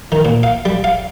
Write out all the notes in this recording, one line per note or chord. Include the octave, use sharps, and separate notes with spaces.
D#3
A#2
F5
G3
F5